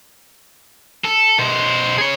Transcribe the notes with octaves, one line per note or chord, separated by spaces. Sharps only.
A4
B2 C5
G#4 C#5